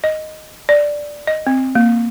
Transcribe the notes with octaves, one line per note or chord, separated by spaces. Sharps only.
D#5
D5
D#5
C4
A#3